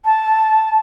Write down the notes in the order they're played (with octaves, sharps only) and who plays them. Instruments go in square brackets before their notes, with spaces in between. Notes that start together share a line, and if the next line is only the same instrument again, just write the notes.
[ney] A5